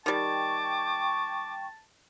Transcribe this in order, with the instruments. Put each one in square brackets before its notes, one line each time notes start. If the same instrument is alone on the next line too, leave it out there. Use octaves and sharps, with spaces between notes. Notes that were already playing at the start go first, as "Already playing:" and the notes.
[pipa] D#3 G3 [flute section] G5 C#6 [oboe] A5 [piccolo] D6